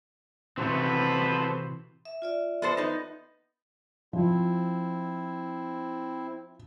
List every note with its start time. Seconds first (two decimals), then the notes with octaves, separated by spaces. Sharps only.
0.57 C3 E3 C4 F#4 A4 B4 C5
2.05 E5
2.22 F4 D5 E5
2.62 B3 A4 C5
2.77 B3 D#4
4.13 F3 C4 E4